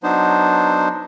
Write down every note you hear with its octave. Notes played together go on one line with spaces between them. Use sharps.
F#3 B3 D4 D#4 C5